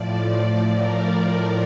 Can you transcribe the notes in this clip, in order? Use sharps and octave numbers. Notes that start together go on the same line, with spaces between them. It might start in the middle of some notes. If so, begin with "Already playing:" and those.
Already playing: A2 F3 D5
A#4